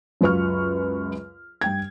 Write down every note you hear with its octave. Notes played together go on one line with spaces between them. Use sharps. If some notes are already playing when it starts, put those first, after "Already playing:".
C#2 F#2 F4 B4 C#6 F6
G2 G5 G#6